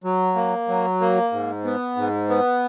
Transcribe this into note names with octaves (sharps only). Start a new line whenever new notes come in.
F#3
A#3
F#3
A#3
G#2
B3
G#2
B3